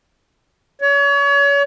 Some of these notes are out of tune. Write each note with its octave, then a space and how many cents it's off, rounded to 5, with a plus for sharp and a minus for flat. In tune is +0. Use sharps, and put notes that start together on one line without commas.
C#5 +35